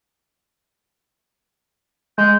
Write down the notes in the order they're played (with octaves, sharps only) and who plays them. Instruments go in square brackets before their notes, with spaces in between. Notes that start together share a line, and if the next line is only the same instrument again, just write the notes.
[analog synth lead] G#3 [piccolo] G6